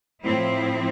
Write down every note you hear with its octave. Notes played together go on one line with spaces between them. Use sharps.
A2 F3 C4 E4